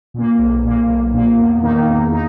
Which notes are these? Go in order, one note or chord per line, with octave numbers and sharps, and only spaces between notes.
A#2 A#3
B1
A#2 A#3
B1
A#2 A#3
E2
D#3 A#3 D#4
E2
D#4